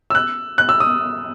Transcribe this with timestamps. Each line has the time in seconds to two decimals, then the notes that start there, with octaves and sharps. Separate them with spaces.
0.10 E6
0.15 F#6
0.58 F#6
0.69 E6
0.80 D#6